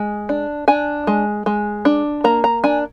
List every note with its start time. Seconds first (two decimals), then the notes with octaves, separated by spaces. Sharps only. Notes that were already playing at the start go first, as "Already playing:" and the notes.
Already playing: G#3
0.29 D4
0.68 D4 G#5
1.07 G#3
1.46 G#3
1.85 D4
2.24 A#3 A#5
2.44 A#5
2.64 D4 G#5